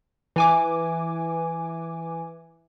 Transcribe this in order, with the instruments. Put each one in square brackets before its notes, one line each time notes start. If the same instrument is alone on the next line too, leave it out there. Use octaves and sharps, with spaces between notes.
[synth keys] E3 G#5 D6